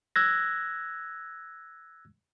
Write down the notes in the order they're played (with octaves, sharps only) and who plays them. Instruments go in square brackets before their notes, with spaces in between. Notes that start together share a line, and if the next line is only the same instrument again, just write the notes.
[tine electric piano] E6 F#6 G#6 A#6